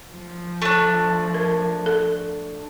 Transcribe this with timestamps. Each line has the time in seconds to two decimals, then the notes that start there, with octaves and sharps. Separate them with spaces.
0.11 F3
0.62 A3 D4
1.34 A#4
1.86 A4